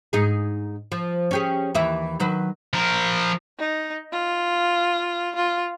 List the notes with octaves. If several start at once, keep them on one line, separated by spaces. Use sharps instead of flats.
G#2 D#4 G#4
F3
C#4 G4 G#4
D#2 E3 E5
D#3 F#3 B4
F3 A#4
D#4
F4
F4